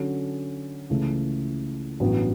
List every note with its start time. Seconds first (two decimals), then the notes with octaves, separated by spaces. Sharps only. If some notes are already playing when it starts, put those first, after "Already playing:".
Already playing: D3 F#3 C#4 F#4 A4
0.90 C#2 C#3 E3 A3
2.00 A1 G2 F#3 B3